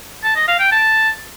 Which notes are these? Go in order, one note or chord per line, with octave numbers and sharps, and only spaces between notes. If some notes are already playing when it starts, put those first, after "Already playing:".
A5
D#5
F5
G5
A5